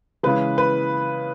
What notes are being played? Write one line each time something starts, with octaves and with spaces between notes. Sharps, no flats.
C#3 E3 G#3 B4
B4